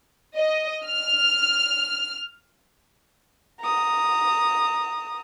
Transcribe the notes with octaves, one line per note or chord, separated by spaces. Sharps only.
D#5
F6
A#5 D#6